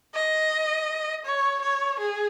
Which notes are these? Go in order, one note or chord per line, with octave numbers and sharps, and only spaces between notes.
D#5
C#5
C#5
G#4